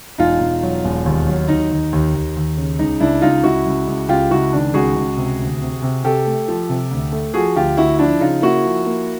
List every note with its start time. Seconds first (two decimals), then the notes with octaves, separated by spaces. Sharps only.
0.18 E1 D#4 F4
0.40 E1
0.62 F#3
0.85 E1
1.06 D#2
1.28 F#3
1.48 D#2 D#4
1.71 D#2
1.93 D#2
2.14 D#2
2.36 D#2
2.57 C#3
2.79 C#2 D#4
3.00 C#2 D4 E4
3.22 C#2 D#4 F4
3.44 C#2 E4 F#4
3.66 C#2
3.87 C#2
4.09 C#2 F4 G4
4.30 C#2 E4 F#4
4.53 D#3 D4
4.74 C#2 F#4 G#4
4.96 C#2
5.17 C3
5.39 D2
5.61 C3
5.82 C3
6.04 C3 G4 A4
6.26 A3
6.48 F3
6.69 C3
6.91 D2
7.12 A3
7.34 F3 F#4 G#4
7.56 D2 F4 G4
7.77 D2 E4 F#4
7.99 F3 D4 E4
8.20 C#3 D#4 F4
8.42 A#3 E4 F#4
8.65 F3
8.86 A#3